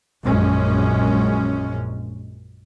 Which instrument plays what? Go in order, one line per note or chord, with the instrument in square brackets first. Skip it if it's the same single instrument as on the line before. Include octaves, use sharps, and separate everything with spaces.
[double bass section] A#1 F#2 G#3 C#4